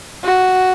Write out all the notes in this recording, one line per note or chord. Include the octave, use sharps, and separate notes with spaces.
F#4